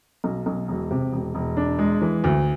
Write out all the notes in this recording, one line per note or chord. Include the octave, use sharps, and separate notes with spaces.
B1
B1
E1
C3
E1
E1
D4
G#3
E3
D2